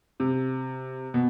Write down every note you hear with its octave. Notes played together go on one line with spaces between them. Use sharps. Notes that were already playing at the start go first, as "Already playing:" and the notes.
C3
B2